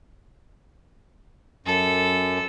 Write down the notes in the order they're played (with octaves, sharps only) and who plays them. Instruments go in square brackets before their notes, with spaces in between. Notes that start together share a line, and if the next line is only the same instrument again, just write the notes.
[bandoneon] F#2 [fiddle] A4